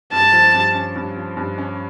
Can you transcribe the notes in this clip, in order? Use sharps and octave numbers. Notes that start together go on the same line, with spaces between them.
G2 A5
F3
G2
C#4
G2
F3
G2
C#4